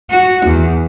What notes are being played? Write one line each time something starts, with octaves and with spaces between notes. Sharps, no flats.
F#4
E2